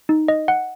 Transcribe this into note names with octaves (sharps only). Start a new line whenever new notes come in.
D#4
D#5
F#5